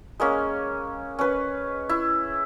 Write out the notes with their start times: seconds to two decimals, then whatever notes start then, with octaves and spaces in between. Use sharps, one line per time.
0.20 G#3 A#3 C#4
1.19 C#4 B4
1.89 E4